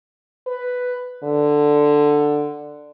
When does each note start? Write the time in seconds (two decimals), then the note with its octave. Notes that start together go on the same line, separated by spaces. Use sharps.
0.47 B4
1.23 D3